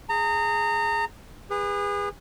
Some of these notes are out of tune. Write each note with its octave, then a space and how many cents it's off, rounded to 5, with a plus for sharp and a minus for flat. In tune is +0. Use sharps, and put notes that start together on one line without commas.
G#4 +0 A#5 -30
G#4 -35 B4 -5